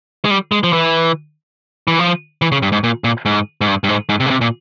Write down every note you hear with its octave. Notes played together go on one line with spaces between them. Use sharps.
G#3
G3
G#3
F3
E3
E3
F3
E3
C#3
G2
G#2
A#2
A#2
G#2
G#2
G2
G2
G#2
G#2
C3
C#3
C3
A#2